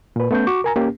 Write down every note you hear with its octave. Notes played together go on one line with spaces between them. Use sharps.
A#2 B4
A3 B3 C#4 G6
F#4 C#6 D6
A#4 G#5 A#5
A#3 C#4 G4